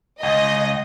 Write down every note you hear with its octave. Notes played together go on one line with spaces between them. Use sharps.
C#2 D#5